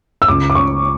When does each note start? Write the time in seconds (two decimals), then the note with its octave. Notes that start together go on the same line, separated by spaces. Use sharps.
0.22 E6
0.28 C#2 D6
0.50 D6
0.55 C#2 C#6